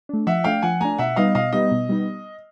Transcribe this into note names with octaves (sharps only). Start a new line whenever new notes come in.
A3 D4
F3 E5 F#5
A3 D4 F5 G5
F3 F#5 G#5
A3 D4 G#5 A#5
B2 E5 F#5
G3 B3 D#4 D#5 F5
B2 D#5 F5
G3 B3 D#4 D#5
B2
G3 B3 D#4